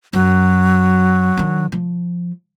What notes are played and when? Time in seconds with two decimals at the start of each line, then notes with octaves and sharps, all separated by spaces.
0.13 F#2 F#3
1.37 D#3 D4
1.72 F3